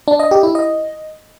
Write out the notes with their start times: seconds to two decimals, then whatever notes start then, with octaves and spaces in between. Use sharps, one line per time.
0.08 D4
0.19 D#5
0.31 G4
0.43 E4
0.55 D#5